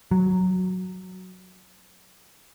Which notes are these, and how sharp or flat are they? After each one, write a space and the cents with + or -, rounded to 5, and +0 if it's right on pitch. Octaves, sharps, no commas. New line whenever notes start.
F#3 +0